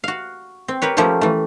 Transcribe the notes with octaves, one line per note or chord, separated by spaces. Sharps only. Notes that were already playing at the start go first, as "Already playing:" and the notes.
F#4 F5
C4
G4 A#4 B4 C#5
F3 A3 A#3 C#4 G4
E3 A3